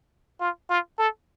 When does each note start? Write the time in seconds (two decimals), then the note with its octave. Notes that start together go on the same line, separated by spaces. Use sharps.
0.40 F4
0.70 F4
0.99 A4